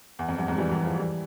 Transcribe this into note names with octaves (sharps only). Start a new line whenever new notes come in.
E2
F2
E2 G2
F2 G#2
E3 G3
E3 G3
F3 G#3
E3 G3